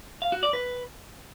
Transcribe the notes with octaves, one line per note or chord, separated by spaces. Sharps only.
F5
F#4
D5
B4